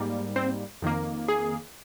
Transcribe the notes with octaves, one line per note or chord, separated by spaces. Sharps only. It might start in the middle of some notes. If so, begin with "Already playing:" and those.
Already playing: G#2 G3 A#3
C4 C5
F2 D#3 A#3
G#4